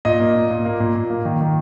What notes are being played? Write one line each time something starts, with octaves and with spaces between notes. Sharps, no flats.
A#2 D#5
A#3
A#2
A#2
A#3
A#2
A#2
A#3
D#3
D#3